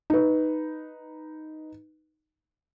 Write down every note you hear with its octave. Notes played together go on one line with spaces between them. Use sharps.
D#4 B4